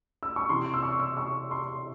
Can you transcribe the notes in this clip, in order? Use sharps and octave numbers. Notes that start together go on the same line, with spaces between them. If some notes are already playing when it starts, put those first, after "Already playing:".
E6
C#6
C3 E3 C6
E6
C#6
E6
C#6
C6